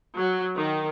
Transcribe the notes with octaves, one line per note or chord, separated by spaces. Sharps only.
F#3
D#3